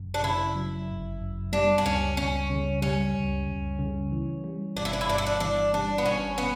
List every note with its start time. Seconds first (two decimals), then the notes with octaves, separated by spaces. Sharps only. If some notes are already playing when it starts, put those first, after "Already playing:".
Already playing: G1 F#2
0.14 D4
0.23 C#3 E4
0.56 F#3
0.88 G1
1.20 F#2
1.52 G3 D4
1.78 D4
1.85 C#2 C#4
2.17 C#2 C#4
2.50 C#3
2.82 G3 C#4
3.14 C#2
3.47 C#2
3.79 C#3
4.12 E3
4.44 G3
4.76 G1 D4
4.85 E4
4.93 D4
5.01 E4
5.09 G2 D4
5.18 E4
5.27 D4
5.40 E3 D4
5.73 G3 D4
5.98 B3
6.05 G1 C#4
6.38 B3